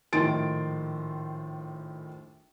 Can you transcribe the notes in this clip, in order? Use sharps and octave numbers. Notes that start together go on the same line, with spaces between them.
A#1 A2 D#3 C6 A6 D7